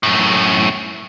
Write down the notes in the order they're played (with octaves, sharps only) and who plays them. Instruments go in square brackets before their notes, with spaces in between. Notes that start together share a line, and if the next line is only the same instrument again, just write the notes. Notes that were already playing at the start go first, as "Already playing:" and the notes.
[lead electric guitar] F#2 A2